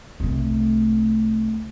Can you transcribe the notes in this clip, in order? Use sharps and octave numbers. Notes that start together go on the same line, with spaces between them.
C2 A3